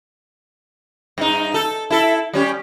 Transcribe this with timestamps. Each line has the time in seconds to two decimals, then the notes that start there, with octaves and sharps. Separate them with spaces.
1.18 G2 D#4
1.54 A4
1.90 E4 A4
2.33 G3 C#4 G4